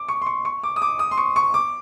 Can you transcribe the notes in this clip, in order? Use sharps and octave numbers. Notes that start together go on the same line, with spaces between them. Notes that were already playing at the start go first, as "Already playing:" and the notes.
Already playing: D6
C#6
C6
C#6
C#6
D6
D#6
D6
D#6
C6
C#6
C#6
D6